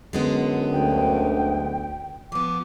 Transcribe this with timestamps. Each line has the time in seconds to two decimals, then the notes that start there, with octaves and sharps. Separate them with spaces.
0.13 F#2 D3 G#3 B3
0.72 D2 G5
2.32 F3 B3 D6